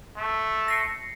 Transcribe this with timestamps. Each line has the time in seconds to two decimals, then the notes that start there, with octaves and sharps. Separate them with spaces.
0.17 A3
0.68 A#6 C7 C#7